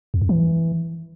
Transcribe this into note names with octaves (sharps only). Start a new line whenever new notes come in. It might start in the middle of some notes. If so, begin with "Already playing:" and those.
E2
F2
E3